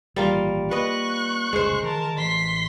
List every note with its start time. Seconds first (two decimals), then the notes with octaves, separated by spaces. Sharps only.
0.16 A#1 D#3 E3 G3 A#3 F4
0.71 A#3 B4 D#5 C#6 F#6
1.53 F1 C2 C#3 G#3 C5
1.83 D#3 E3 A#4 A5
2.18 A1 E3 C6 B6